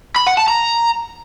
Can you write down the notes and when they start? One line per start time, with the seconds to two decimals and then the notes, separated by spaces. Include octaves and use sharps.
0.16 B5
0.27 F#5
0.37 A5
0.48 A#5